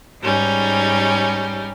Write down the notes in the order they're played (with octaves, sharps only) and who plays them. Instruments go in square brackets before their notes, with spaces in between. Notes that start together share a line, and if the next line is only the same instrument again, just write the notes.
[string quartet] G#2 G3 C#4 D#4